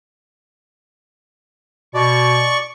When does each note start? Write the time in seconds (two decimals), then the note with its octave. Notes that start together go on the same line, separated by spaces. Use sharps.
1.94 B2 D5 C#6